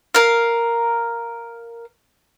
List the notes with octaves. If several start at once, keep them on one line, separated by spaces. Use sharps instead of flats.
A#4 F5